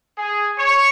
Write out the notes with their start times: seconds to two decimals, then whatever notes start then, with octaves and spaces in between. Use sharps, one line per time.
0.18 G#4
0.58 C#5